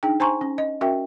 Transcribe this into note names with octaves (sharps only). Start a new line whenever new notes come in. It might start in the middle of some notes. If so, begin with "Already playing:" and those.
D4 D#4 G#4 G5
C5 G#5 A#5 C6 C#6
C#4
D#5
C#4 F#4 A#4 E5 G5